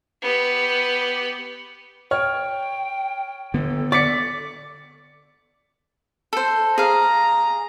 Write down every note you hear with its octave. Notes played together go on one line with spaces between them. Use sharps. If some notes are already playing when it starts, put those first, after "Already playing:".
B3 G4
C#5 G5 F6
D3 B3 A4
D5 D6 B6 C#7
A4 C5
G#4 F5 A#5